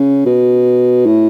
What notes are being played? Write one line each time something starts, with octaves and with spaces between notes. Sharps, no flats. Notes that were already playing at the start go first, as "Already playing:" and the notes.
Already playing: C#3
B2
A2